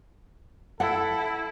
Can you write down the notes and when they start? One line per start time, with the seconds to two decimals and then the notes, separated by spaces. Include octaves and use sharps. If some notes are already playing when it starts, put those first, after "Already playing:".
0.80 E4 A4 F#5